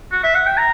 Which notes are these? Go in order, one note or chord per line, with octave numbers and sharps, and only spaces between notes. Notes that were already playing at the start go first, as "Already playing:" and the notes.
F#4
E5
F#5
G5
A#5